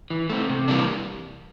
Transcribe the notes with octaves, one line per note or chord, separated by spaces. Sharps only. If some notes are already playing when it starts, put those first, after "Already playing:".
E3
A3 C4
C3
E3 G3 A#3 D4